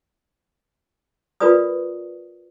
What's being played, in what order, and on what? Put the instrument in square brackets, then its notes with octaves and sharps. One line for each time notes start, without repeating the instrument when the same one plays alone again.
[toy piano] F4 A#4 B4 D5 D#6